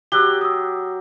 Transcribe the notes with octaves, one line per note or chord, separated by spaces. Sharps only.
F#3 G4 E6 F#6 G7
D#6 E6